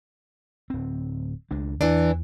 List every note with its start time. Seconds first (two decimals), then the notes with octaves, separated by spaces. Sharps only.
0.70 D1 C4
1.51 C#2 G#3 D4
1.81 E2 E3 D4